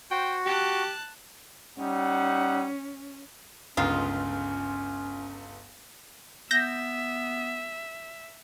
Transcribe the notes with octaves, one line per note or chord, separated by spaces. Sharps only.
F#4 C5 G5
G4 A5 F#6
G3 C#4 D#4 F#5
G1 C#2 D#3 G#3 C#4 F4
B3 E5 G6 A#6